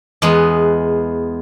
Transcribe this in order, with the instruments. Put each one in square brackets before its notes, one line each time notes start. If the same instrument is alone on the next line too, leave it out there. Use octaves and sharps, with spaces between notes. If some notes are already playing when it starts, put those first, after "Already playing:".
[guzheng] E2 G#3 B3